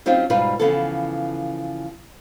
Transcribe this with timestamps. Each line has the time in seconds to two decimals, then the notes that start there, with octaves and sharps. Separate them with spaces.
0.06 F#3 C4 C#4 D#4 F4 G4
0.30 G#2 B2 G3 D#4 F4 B4
0.59 C#3 E3 F3 B3 A4